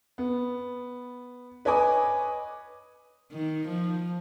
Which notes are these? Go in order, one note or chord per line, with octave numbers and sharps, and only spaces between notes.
B3
B4 C#5 D#5 G#5 D6 D#6
D#3
F3